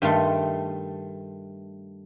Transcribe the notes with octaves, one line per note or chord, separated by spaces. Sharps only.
G2 D#3 A3 C6